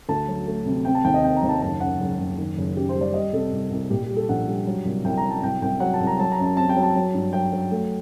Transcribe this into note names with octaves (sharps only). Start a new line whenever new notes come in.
D2 A5
F#3
A3
C3
C4 G5
A5
D#2 G5
D#5
C4 G5
A#5
D#2
A5
F#1 A5
F#2 F#5
F#1
F#1
D#3
F#1
F#2 G4
C5
G3
D5
G3 D#5
C3 A4
C2
C2
A#2 G4
G4
G3
A4
A#1 F#5
G3
F#3
C2
C2 G5
A#5
F#3
A5
C2 G5
C2 G5
F#3 F#5
A5
C2
A#5
F#3 A5
A#5
F#2
A5
C4 A5
G5
F#3
A5
F#3
G2
F#3 G5
F#3
A3